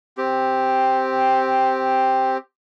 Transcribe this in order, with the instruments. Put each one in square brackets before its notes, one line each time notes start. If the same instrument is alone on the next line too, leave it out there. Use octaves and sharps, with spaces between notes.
[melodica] C4 G4